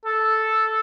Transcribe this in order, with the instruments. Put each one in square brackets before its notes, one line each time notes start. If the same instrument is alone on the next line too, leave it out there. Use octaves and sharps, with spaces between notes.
[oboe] A4